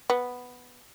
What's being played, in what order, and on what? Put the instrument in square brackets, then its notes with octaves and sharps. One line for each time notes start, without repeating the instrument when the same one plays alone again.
[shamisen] B3